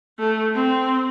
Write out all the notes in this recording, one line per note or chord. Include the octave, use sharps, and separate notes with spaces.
A3
C4